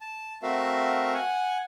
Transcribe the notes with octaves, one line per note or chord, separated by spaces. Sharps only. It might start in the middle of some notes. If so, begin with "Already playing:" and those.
A5
A3 C4 F#4 A#4 E5 F5
F#5 G#5